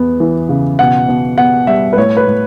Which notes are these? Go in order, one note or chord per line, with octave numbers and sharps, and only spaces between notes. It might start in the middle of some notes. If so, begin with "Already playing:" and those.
Already playing: E2 B3
E3
C#3
B2 F#5
B2
B3 F#5
G3 E5
B4
A2 C#5
B4
A2